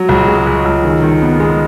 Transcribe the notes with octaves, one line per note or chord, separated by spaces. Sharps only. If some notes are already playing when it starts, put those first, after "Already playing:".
Already playing: F#3
C#2
G#3
C#2
C#2
D#3
D#3
B3
G#3